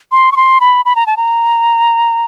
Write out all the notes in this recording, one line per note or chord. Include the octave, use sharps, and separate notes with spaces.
C6
C#6
C6
B5
B5
A#5
A5
A#5